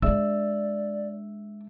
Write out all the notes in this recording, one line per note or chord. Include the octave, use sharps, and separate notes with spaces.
G#3 D4 D5 E5 E6